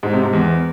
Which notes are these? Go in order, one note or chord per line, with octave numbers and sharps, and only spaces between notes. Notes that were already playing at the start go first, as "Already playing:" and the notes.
G#2
C3
G#2
E2